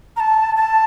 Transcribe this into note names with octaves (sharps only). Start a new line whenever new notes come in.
A#5
A5
A5